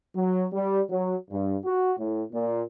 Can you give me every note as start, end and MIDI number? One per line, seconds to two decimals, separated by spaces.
0.15 0.46 54
0.51 0.80 55
0.89 1.15 54
1.31 1.55 43
1.63 1.92 66
1.98 2.23 45
2.32 2.62 46